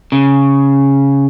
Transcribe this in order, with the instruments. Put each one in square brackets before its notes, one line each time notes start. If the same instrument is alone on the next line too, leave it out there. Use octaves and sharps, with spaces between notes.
[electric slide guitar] C#3